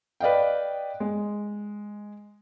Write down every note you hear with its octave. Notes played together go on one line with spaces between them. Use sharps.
B4 D5 D#5 F5 G5
G#3